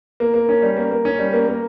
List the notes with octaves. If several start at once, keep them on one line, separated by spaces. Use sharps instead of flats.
A#3
A#3
C#4
G3
A#3
A#3
C#4
G3
A#3
A#3